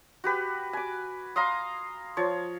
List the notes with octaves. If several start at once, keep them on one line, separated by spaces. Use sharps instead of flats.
F#4 G4 B4
G#5 D6
F5 A#5 C6 D#6
F3 C#5